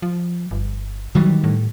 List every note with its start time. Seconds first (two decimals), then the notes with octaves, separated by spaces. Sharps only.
0.02 F3
0.51 G1
1.15 D#3 E3 F#3 G3
1.44 A2